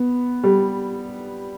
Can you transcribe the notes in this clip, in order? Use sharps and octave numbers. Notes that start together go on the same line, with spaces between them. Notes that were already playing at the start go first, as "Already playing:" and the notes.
Already playing: B3
G3